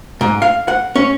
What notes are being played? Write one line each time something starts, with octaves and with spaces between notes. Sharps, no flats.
G#2
F5
F#5
C#4